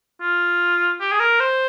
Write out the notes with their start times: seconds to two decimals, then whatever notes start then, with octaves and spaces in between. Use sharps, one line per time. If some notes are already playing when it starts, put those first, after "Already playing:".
0.21 F4
1.00 G4
1.12 G#4
1.20 A#4
1.40 C5